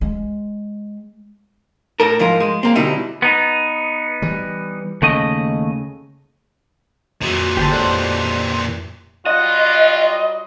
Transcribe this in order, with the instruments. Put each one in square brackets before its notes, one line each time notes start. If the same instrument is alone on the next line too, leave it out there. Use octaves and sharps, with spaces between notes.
[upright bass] G#3
[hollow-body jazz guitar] A2 A4 A#4
G#2 F3 F4 A#4
G#3
A#3 C4
B2 D3 G3 C4 D#4 E4
[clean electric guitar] B3 D#4
[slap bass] E3 G3
[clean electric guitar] D#2 A3 D#5 [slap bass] C#3
[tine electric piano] F2 [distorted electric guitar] A#2 E3 [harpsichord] F#3 G#4 G#5
[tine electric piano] G1 D3 [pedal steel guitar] G4 C5 A5
[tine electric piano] F2 F#6 [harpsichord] D3 F#3 G#3
[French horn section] F#3 G3 F4 [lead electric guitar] D#5 [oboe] F#5